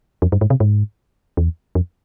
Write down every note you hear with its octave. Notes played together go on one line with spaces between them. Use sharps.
F2
G2
G#2
C3
G#2
E2
F2